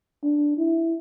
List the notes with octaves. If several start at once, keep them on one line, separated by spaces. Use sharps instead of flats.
D4
E4